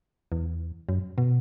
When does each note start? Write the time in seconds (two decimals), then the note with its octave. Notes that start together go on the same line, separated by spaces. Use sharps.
0.32 E2
0.89 F#2
1.18 B2